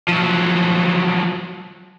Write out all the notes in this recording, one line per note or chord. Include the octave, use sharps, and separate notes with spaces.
F3 F#3